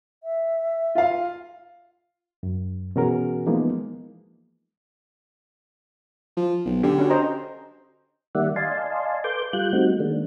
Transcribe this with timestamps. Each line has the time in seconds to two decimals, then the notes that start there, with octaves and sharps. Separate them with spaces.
0.23 E5
0.95 F4 F5
2.43 F#2
2.96 B2 E3 C#4 F#4 G#4 A#4
3.46 E3 F3 G#3 A#3 B3 D#4
6.37 F3
6.66 B1
6.83 D3 G4
6.98 C#4 F#4
7.10 C5 D#5 A#5
8.35 D#3 G3 A#3 D5 E5 F#5
8.56 D5 D#5 F5 G#5 A5 C6
9.24 A4 B4 C6 D6 G6
9.53 G3 F4 F#6 G6
9.73 G3 A3 C4 D#4 F#4
10.00 D#3 G#3 A#3 D4